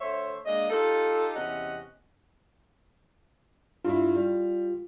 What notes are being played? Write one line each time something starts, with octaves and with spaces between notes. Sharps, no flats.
D3 A3 C5 C#5 E5
G#3 A#3 D4 D#5
D#4 F4 G4 A4
E2 C3 C#4 D#5 F#5
G2 E4 F4
G3